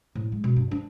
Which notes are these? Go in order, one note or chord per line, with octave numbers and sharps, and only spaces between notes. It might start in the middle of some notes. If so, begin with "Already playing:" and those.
A2
G#3
B2
G2
D4